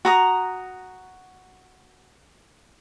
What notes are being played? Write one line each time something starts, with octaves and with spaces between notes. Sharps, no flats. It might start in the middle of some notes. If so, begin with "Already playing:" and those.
F#4 A#5 D#6